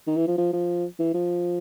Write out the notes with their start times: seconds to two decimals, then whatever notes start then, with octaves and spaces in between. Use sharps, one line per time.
0.07 D#3
0.17 E3
0.27 F3
0.37 F3
0.53 F3
0.99 E3
1.14 F3